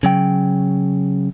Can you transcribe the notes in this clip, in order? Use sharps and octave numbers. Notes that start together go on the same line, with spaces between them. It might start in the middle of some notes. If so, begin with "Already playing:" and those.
C#3 F#3 G5